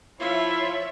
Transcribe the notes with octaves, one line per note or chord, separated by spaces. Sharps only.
F3 E4 F4 C#5 E5